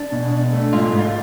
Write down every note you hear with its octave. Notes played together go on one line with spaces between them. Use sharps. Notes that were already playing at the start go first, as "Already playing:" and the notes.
Already playing: D4
B2
D4
A3
G#2 F4
G#2
F4